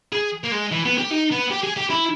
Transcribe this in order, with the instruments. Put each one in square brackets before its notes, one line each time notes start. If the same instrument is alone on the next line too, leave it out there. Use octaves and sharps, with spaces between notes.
[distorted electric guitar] G#4
A#3
G#3
E3
B3
G4
D#4
B3
G4
G#4
G4
E4